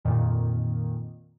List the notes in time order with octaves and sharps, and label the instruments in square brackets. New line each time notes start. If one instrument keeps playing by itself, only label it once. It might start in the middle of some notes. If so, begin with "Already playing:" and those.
[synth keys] F2 A#2 D#3